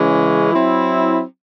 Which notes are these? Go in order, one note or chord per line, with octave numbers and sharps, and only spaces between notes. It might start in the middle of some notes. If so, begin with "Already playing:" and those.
Already playing: C#3 E3 G#3 C#4
F#3 C4 E4